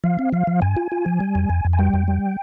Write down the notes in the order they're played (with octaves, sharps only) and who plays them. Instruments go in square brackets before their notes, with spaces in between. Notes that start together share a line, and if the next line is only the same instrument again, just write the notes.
[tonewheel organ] F3 F5
C4
F3 F5
F3
G2 G#5
F4
F4
F3
G3
F2
F2
F2
G#5
G3 G5
F2
G3